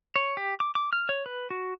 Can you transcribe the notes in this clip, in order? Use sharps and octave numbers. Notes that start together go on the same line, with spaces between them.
C#5
G4
D6
D6
F6
C#5
B4
F#4